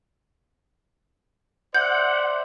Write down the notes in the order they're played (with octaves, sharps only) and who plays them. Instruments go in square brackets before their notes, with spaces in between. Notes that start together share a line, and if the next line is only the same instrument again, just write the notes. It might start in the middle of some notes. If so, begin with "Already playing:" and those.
[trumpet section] C5 D5 E5 [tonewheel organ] F#5 [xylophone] G6